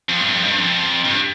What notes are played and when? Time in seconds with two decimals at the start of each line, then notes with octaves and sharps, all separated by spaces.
0.09 F2
0.20 G2
0.33 F2
0.44 G2
0.57 F2
1.04 G2